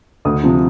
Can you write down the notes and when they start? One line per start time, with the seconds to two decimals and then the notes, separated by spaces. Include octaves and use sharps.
0.25 D2 D#6
0.43 C3 F3